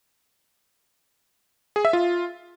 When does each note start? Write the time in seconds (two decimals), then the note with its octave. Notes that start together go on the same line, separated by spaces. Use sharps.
1.76 G#4
1.85 E5
1.93 F4